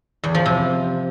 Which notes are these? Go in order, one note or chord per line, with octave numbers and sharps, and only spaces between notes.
E2
F3
C3